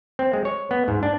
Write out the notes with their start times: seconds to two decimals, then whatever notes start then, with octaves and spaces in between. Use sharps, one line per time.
0.19 C4
0.33 G#3
0.45 C#5
0.71 B3
0.88 G#2
1.03 D4